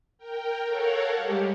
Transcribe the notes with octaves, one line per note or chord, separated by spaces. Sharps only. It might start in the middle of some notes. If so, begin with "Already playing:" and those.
A#4 G5
A4 A#4 C#5 F5 F#5
G3 G#3 G4